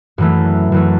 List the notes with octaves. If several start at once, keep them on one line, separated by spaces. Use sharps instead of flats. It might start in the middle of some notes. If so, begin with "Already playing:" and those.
F#2 E3 A3
F#2 E3 A3